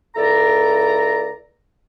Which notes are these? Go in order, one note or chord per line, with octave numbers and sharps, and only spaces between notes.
C#2 E4 A4 D5 A#5